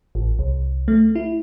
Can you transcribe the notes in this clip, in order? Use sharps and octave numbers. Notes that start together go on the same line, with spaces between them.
A1
C2
A3
E4